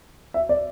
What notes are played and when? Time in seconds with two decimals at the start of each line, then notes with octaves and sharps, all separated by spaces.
0.34 E5
0.49 D5